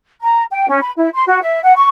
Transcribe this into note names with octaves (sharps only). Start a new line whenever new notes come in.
A#5
G5
C#4
B5
E4
C6
F#4
E5
F#5
C#6